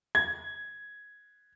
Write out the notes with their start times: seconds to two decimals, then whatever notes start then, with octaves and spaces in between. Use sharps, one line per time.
0.15 G#6